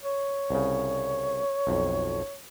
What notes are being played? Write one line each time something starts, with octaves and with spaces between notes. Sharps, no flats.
C#5
C2 C#3
B1 F2